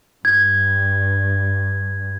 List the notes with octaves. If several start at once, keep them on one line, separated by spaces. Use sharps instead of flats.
G2 G#6